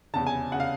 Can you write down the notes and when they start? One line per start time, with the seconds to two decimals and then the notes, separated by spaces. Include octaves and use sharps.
0.14 F1 E2 C#3 A5
0.27 G#5
0.52 C#3 F#5
0.60 F5